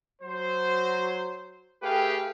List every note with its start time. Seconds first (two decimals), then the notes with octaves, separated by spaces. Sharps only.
0.22 F#3 C5
1.83 A3 G4 G#4 B4 F5 G5